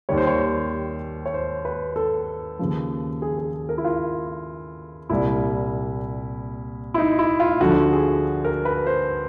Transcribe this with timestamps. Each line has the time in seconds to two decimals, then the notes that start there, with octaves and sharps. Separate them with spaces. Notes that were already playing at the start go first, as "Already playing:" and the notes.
0.09 D#2 D#3 G3 C#5
0.18 C5
0.27 C#5
1.26 C#5
1.34 C5
1.65 B4
1.96 A4
2.59 D#2 C#3 F3
3.22 G#4
3.38 G#4
3.69 A#4
3.78 E4
3.85 F4
5.09 C2 A#2 G3 E4
6.94 E4
6.98 D#4
7.19 E4
7.40 F4
7.61 D2 D3 F3 F#4
7.93 G#4
8.45 A#4
8.65 B4
8.87 C5